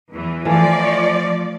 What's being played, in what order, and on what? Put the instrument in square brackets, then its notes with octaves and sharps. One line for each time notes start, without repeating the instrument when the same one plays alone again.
[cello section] E2 E3
[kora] E3 A3 F5 [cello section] F3 D5